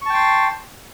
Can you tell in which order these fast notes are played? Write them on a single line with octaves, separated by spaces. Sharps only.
C#6 A5 G5 C6